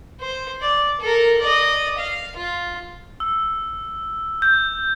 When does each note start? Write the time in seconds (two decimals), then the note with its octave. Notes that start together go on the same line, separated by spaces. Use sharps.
0.21 C5
0.61 D5
1.01 A4 A#4
1.41 D5 D#5
1.98 F5
2.36 F4
3.20 E6
4.42 G6